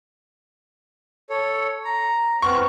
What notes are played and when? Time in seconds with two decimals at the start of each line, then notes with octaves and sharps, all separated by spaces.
1.30 A4 C#5
1.85 A#5
2.42 B3 C4 C#6 F6